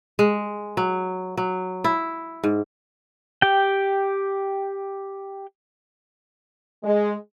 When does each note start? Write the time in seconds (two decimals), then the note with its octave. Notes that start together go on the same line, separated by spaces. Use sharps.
0.19 G#3
0.77 F#3
1.37 F#3
1.84 E4
2.43 G#2
3.42 G4 G5
6.84 G#3